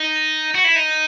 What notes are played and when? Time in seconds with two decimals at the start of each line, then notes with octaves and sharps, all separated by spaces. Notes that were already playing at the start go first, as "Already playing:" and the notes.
Already playing: D#4
0.55 F#4
0.64 E4
0.76 D#4